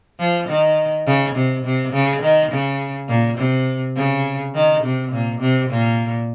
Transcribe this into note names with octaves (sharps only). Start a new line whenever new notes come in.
F3
D#3
C#3
C3
C3
C#3
D#3
C#3
A#2
C3
C#3
D#3
C3
A#2
C3
A#2